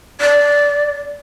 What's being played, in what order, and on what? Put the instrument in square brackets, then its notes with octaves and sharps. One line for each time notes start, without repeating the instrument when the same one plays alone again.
[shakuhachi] D5